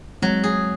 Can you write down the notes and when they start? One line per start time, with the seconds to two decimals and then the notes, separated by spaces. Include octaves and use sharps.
0.22 F#3 G#3 C4
0.44 G#4